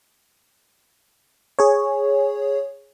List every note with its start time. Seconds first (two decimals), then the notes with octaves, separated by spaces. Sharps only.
1.59 G#4 C#5